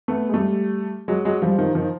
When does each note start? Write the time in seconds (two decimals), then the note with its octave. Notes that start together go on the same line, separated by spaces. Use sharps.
0.08 A3 B3
0.29 G#3
0.34 G3 A3
1.08 F#3 G#3
1.25 F#3 G#3
1.42 F3 G3
1.59 D#3 F3
1.75 D#3 F3